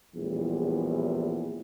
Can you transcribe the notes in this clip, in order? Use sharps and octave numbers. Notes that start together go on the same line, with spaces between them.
A#1 E2 A2 G3